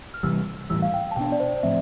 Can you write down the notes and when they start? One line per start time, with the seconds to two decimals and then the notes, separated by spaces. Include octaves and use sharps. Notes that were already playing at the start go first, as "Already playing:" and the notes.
0.14 F6
0.23 C3 E3 G3 E6
0.70 A2 E3 G3 E6
0.82 F5
0.94 G5
1.11 A5
1.16 B2 B3 D4 G5
1.32 D5
1.40 C5
1.63 A2 F3 A3 C4 E5